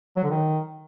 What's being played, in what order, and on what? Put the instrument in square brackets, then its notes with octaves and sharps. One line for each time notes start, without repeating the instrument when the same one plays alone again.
[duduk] F#3
D3
D#3